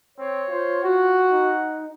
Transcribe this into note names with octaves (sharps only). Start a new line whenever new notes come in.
C4 C#5
F4 C5
F#4 F#5
D#4